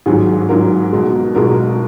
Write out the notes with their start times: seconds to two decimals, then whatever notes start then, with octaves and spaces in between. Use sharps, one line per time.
0.06 G#1 G#2 F#3 G#4
0.49 G#1 G#2 F#3 A#4
0.92 B1 B2 G#3
1.35 B1 B2 G#3 A#4